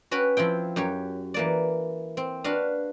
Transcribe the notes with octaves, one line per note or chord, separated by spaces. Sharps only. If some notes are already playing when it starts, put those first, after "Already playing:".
C#4 F#4 B4 G5
F3 C4 E4 G5
F#2 G4 C#5
E3 A#3 D5
C4
D4 F#4 B4 F5